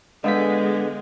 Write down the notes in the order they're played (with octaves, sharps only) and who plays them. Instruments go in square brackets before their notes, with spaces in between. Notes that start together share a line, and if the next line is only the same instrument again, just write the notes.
[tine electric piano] D3 B3 B6 [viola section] G#3 [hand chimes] D#5 F5 G6